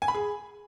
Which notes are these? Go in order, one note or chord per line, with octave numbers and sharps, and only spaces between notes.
G#5
B5
G#4